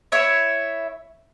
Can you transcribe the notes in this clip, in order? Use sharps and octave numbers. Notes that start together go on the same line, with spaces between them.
E4 C#5 E5